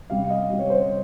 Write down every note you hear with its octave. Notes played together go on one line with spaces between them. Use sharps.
C3 G3 F5
D#5
C3 G3
C#5
C5